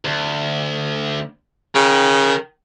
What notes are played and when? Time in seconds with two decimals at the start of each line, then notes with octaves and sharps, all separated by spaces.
0.05 D2
1.75 C#3 A#4 G5